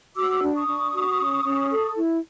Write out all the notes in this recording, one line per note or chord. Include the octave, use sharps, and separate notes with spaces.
F#4 D6 E6
D4
C#6 D#6
D4
F#4
C#4
C#4
A4
E4